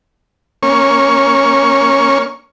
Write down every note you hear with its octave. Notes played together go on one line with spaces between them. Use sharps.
A#3 C#4 C#6